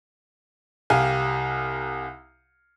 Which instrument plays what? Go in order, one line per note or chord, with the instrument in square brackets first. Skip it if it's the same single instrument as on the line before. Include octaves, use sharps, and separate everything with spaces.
[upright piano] C2 G4 F5 G#5